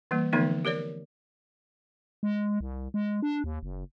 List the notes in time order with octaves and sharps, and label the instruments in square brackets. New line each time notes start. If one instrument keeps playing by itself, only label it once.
[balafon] E3 G3 A#3
D3 E3 F3 A3 B3 D#4
G4 A#4 C#5 D5
[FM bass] G#3
C2
G#3
D4
D#2
F#1